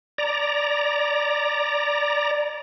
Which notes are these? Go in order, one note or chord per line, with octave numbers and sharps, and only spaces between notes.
D5 A#5